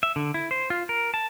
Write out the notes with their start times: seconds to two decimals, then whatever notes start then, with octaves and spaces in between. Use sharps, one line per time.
0.03 E5
0.16 D3
0.34 E4
0.51 C5
0.70 F4
0.89 A#4
1.14 A5